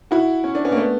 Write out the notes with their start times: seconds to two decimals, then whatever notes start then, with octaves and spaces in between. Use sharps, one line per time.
0.11 E4 F#4
0.44 C#4
0.55 D4
0.65 B3 C#4
0.72 A#3
0.77 A3 B3